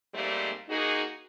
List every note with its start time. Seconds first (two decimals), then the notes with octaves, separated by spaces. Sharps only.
0.14 G#2 G3 A3 A#3 C4
0.69 A#3 D#4 F#4 G#4